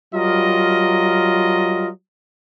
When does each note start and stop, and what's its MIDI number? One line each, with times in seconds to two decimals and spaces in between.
0.14 1.89 54
0.14 1.89 55
0.14 1.89 65
0.14 1.89 70
0.14 1.89 75